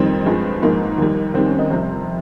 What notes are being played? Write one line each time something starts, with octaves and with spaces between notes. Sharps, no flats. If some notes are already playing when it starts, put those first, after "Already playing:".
Already playing: F2 D#3 G3 C4
G2 F3 G#3
G#2 F3 G#3 A#3
D#2 D#3 G3
D#2 D#3 G3 C4
C#4
D#4
F2 C3 G3 C5